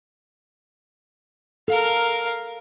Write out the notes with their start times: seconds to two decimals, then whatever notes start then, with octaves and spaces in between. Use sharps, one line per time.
1.68 A4 A#4 F5